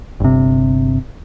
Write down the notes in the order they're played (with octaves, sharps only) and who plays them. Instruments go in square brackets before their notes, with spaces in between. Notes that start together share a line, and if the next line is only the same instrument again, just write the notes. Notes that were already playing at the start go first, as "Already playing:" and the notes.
[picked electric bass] G1 C3